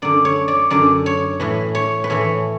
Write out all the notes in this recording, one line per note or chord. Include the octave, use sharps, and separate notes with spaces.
F#2 D3 D5
C#5
D5
F#2 D3 D5
C#5
A2 E3 B4
C#5
B4
A2 E3 C#5